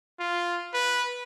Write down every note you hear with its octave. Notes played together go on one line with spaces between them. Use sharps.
F4
B4